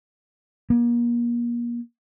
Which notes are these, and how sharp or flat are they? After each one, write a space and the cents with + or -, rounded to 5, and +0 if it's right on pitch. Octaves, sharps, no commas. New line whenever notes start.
A#3 +35